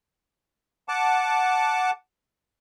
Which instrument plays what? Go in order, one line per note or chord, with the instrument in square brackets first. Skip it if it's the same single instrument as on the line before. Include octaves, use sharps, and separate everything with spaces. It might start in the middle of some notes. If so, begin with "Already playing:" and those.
[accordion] F#5 A5 D6